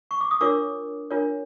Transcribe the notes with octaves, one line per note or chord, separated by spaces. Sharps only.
C#6
D6
D#6
D4 F4 A#4 C#5 D6 E6
D4 F4 A#4 C#5